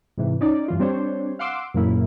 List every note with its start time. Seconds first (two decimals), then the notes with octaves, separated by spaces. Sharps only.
0.17 G#2 C3 E3
0.41 C#4 D#4 D5
0.68 G2 E3 F4
0.79 G3 C4 D4 C5 C#5
1.39 F5 F#5 C6 D6 E6
1.74 F#2 A#2 C#3 A#3 E4